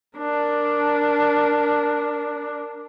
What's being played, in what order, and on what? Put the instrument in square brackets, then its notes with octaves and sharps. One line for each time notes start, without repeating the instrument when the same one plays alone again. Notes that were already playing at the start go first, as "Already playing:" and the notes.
[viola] D4 A#4